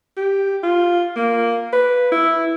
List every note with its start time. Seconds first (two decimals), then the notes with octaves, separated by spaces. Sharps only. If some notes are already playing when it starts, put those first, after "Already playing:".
0.17 G4
0.63 F4
1.16 A#3
1.73 B4
2.12 E4